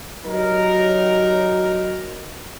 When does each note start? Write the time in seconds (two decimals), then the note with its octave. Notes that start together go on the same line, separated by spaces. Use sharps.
0.24 F#3 D#4 G4 A#4